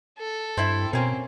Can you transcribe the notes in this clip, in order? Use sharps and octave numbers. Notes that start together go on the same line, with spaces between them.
A4
G2 C4 E4 E5
B2 A#3 C4 C#4